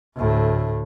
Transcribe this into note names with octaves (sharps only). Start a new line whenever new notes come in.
D2 A2